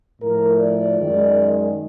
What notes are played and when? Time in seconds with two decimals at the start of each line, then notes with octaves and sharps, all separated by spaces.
0.21 A2 F3 A3 A#4
0.59 D5
0.97 F#2 D#3 G#3